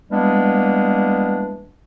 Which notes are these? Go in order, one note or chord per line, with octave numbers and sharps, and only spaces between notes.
E3 G3 G#3 A#3 B3 D4